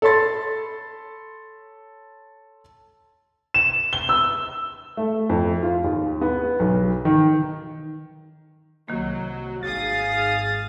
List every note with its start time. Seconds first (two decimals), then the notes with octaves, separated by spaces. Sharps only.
0.02 A4 C#5 B5 C6 A6
3.54 E7
3.93 G7
4.09 E6
4.97 A3
5.29 F2
5.63 F4
5.84 D#2
6.21 B3
6.60 B1
7.05 D#3
8.88 C2 D#3 F#3 A#3
9.63 G#1 G#4 F5 D#6 A6